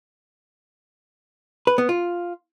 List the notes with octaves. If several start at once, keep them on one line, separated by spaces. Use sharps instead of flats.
B4
B3
F4